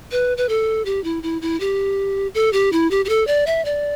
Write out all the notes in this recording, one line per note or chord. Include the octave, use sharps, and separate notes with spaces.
B4
B4
A4
G4
E4
E4
E4
G4
A4
G4
E4
G4
G4
A4
D5
E5
D5